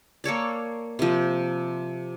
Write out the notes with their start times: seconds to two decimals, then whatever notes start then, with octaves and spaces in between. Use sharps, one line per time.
0.24 A#3 A4 C#5 D5
0.99 C3 F3